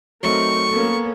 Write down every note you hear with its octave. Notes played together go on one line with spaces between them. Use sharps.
F#3 A3 C4 D#4 A#4 C#6
A#3 B3 C#4 A4